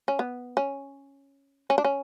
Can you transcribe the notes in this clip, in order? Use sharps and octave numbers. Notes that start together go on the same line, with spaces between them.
C#4
B3
C#4
C#4
D4
C#4